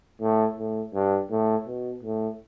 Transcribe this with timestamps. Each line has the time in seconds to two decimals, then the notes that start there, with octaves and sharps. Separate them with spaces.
0.21 A2
0.58 A2
0.94 G2
1.31 A2
1.67 B2
2.03 A2